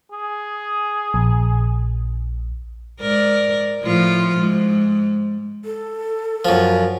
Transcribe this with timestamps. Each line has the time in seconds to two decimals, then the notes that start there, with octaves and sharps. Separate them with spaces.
0.12 G#4
1.14 A#1
3.01 G#2 A#4 D5
3.83 A2 F3 F4
4.37 G#2
5.65 A4
6.45 F#2 F3